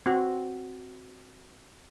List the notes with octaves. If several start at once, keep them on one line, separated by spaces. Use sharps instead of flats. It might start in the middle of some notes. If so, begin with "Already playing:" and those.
C4 F#4